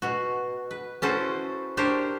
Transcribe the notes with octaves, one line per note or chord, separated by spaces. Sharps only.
B2 F#4
B4
C#4 E4 F#4 A4 B4 C5
D4 G4 A#4 C5 C#5